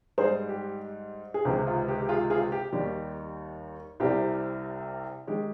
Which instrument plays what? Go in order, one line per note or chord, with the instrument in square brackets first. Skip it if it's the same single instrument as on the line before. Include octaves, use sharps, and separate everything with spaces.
[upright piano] G#2 G3 G#4 C5
G4
G#4
C#2 C3 D#3 G#3 G4
F4
G4
G4
F4 G#4
F4 G#4
G4
D#2 D#3 G3 G4
C2 C3 G3 G4
D#3 G#3 G4